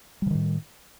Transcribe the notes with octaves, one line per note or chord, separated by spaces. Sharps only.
A2 D3 D#3 G3